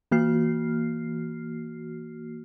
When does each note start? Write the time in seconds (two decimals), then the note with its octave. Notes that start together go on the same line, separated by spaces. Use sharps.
0.11 E3 A#3 F#4 F6 C7